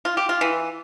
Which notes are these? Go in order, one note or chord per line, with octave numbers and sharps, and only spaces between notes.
F4
G4
F4
E3